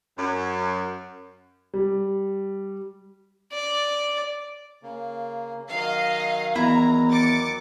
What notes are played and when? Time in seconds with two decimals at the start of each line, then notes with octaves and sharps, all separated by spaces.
0.18 F#2
1.74 G3
3.52 D5
4.83 C#3 A#3
5.70 D#3 F#3 D#5 F5
6.56 E2 E4 A#5
7.09 D6 A6 C#7